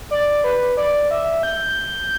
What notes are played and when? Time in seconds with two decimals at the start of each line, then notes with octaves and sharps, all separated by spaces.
0.11 D5
0.44 B4
0.77 D5
1.11 E5
1.43 G6